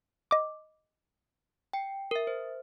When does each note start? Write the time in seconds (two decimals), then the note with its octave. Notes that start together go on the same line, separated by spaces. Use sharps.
0.31 D#5 D6
1.73 G5 C#7
2.11 A#4 E5
2.27 C5